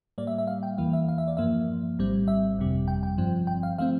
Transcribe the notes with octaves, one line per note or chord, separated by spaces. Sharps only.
A2 G3 A#3 D5
E5
E5
F5
G5
E2 E3 A#3 F5
E5
F5
E5
D5
G2 F3 A#3 E5
A#1 A2 G3 C4
E5
G1 F2 C3 G3
G5
G5
G2 F3 C4
G5
F5
F3 A3 C4 F5